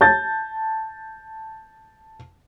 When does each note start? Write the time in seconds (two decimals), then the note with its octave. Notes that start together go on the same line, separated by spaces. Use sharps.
0.01 A5 G6 A6